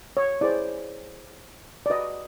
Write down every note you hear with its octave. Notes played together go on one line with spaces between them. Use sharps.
C#5
E4 G#4 C5 D5
D5
F#4 B4 D#5